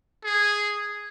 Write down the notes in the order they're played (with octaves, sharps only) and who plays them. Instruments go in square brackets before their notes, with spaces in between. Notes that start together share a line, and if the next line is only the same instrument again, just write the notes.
[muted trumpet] G#4